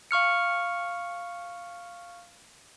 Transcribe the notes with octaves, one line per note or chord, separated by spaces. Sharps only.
F5 C#6 F6 C#7